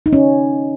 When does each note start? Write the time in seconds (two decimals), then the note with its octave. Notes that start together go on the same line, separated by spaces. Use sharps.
0.06 D#4
0.13 C#4